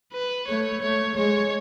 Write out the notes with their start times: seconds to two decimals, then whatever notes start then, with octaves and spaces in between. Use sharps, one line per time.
0.13 B4
0.48 A3 C#5
0.82 A3 C#5
1.16 G#3 C#5